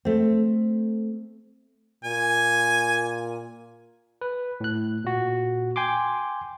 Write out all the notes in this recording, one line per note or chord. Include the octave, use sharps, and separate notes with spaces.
A3 C4
A#2 G#5
B4
A2 F#6
A#2 F#4
G5 G#5 C6 D6